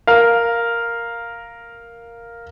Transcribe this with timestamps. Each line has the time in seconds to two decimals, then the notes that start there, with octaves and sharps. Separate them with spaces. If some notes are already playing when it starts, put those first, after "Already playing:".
0.07 A#4 F5